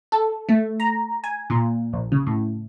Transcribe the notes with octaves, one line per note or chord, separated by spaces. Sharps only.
A4
A3
A#5
G#5
A#2
A#1
C#3
A2